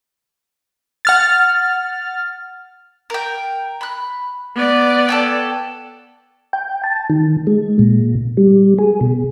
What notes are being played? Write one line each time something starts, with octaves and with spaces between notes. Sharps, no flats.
F#5 F6 A6
A#4 G5
B5 F#6
B3 D5
A4 C#5 G5
G5
A5
D#3
G#3
A#2
G3
G#4
B2